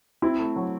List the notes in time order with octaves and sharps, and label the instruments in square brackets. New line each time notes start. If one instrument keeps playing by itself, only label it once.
[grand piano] C4 [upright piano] E4
[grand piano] A3
F#3